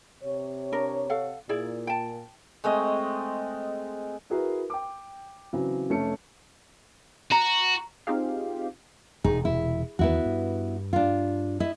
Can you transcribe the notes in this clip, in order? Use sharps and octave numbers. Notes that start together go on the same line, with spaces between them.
C3 C#5
D4 A#4
A4 F5 F#5
A#2 E4 G#4 D5
G5 A5
G#3 A3 C4 D#5
E4 F#4 G#4 A#4 B4
G5 D6
C#3 E3 F#3 C4
F1 A3 C#4 A5 C#7
F#4 A#5
C4 D#4 F4 G4 G#4 F5
E1 C3 D#4 G#4
E4
E2 D#3 B3 E4 F#4
G2
D4 F4
E4 D#5